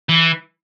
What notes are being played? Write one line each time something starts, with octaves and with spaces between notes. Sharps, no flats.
E3